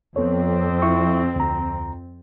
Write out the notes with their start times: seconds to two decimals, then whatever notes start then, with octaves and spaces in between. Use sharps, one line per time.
0.16 F2 B3 C4 A4 C#5
0.82 E4 E5 C#6
1.36 D2 A#5